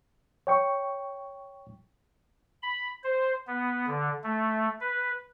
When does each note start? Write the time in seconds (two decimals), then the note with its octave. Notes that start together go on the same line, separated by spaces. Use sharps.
0.47 C#5 G5 C#6
2.62 B5
3.04 C5
3.47 B3
3.87 D3
4.24 A3
4.81 B4